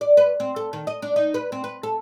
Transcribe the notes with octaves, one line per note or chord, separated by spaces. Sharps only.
D5
B4
C4
A4
D#3
D#5
D4
D#4
B4
C4
B4
A4